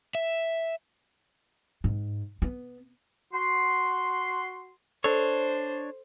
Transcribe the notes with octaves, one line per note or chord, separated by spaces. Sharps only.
E5
G#2
B3
F#4 C6
D4 A4 C5 C#5